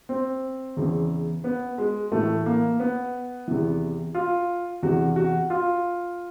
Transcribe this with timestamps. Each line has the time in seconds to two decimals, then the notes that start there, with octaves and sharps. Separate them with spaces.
0.09 C4
0.77 E2 C#3 E3
1.44 B3
1.78 G#3
2.12 A2 E3 A3
2.46 A#3
2.79 B3
3.48 E2 C3 E3
4.15 F4
4.83 E2 C3 E3 F#4
5.16 F#4
5.50 F4